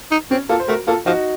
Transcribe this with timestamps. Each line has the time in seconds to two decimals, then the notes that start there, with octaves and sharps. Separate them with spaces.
0.11 D#4
0.31 C4 C#4
0.49 A#3 F4 A4
0.60 C5
0.68 A3 F#4 A#4
0.87 A#3 F4 A4
1.06 F3 D#4 F#4